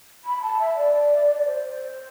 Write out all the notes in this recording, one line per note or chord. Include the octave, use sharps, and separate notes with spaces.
B5
A5
E5
D5
C5